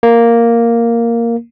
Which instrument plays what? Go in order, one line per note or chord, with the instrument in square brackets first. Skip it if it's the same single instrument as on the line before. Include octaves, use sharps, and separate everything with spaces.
[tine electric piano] A#3